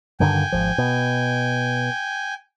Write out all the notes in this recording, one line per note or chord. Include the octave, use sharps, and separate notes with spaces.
G2 D3 D#3 G5 G#5
G#1 C#2 F3
B2